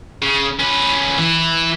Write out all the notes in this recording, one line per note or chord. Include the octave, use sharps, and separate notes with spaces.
C#3
C#4 B4
E3 E4